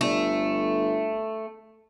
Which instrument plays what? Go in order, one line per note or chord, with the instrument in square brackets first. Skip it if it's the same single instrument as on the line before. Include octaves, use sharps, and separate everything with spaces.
[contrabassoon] G1 [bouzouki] A3